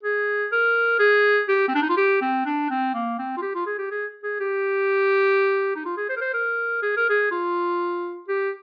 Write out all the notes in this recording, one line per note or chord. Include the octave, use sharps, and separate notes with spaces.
G#4
A#4
G#4
G4
C4
D4
D#4
F4
G4
C4
D4
C4
A#3
C4
F4
G4
F4
G#4
G4
G#4
G#4
G4
D#4
F4
G#4
C5
A#4
C5
A#4
G#4
A#4
G#4
F4
G4